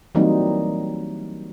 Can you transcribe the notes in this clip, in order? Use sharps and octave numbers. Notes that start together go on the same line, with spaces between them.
E3 F#3 G3 A#3 C4 D#4